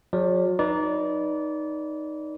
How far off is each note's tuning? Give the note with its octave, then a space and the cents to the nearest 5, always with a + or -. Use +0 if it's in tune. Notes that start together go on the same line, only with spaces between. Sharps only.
F#3 -35 G#4 +0 D5 +0
D#4 +0 B4 -20 D5 -25